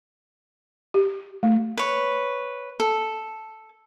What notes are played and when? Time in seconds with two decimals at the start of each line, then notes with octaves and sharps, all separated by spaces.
0.94 G4
1.43 A3
1.77 B4 C#5
2.80 A4